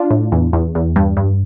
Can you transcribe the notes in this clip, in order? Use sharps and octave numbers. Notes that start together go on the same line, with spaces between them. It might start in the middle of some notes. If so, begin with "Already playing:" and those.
Already playing: D4 F4
A2
E2
E2
E2
G2
G2